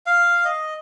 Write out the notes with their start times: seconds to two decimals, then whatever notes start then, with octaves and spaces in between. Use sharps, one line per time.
0.06 F5
0.45 D#5